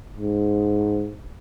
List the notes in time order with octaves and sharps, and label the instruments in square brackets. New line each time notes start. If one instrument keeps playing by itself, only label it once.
[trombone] G#2